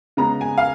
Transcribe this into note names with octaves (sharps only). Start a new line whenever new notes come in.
C#3 G#3 B3 A#5
G#5
F5